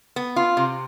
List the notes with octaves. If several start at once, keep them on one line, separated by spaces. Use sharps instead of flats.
B3
F4
C3